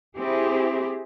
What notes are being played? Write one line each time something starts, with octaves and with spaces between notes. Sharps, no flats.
C4 E4 G4 G#4